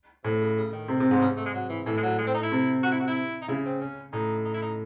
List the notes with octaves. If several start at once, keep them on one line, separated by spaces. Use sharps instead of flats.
A2 C3
C#3
C#3
D#3
C3
C3
G#2
C#3
A3
G#3
F#3
E3
A2 E3
G#3
F#3
G#3
C4
D#4
E4
C3
F#4
E4
F#4
E4
D#4
C#3 E4
C4
C#4
A2 D#4
D#4
E4
D#4